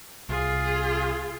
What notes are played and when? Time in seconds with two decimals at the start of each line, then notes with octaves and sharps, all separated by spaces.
0.29 C2 F4 G#4